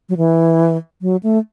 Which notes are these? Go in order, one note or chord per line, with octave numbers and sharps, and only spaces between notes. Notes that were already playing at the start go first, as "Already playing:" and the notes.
F#3
E3
F#3
A3